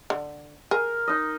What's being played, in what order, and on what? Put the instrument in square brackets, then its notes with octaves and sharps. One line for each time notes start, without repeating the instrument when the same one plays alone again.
[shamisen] D3
[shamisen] G#4 [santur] A#4
[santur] D#4 D#5